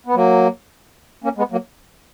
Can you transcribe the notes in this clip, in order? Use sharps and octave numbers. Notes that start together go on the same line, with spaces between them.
B3
F#3 A#3
A#3 C#4
G#3 B3
F#3 A#3